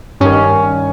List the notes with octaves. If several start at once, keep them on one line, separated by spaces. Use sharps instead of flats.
G2 D#3 C#4